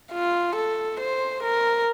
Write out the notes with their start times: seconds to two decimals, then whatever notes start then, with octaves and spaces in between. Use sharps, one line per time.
0.12 F4
0.56 A4
1.00 C5
1.43 A#4